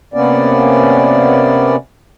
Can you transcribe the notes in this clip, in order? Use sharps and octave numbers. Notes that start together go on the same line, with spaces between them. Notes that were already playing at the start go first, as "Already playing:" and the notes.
C3 A#3 B3 C#4 D5